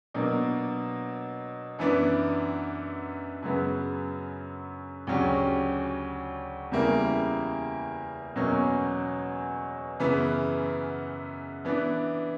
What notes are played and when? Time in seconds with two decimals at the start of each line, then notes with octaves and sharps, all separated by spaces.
0.14 B2 F#3 A#3 D4
1.79 F#2 E3 B3 D4
3.42 F#2 C#3 F#3 B3
5.07 D2 C#3 F#3 C#4 G4
6.71 E2 C#3 G3 A#3 E4
8.36 E2 B2 F#3 A#3 C#4
10.00 F#2 C#3 E3 B3
11.65 E3 B3 D4